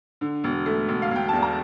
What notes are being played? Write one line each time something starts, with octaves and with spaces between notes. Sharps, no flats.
D3
E1
A3
E1
F5
E1 G5
E2 A5
A#5